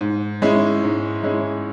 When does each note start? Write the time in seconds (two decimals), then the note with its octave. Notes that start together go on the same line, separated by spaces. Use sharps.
0.01 G#2
0.42 G#3 C#4 E4
0.83 G#2
1.23 G#3 C#4 E4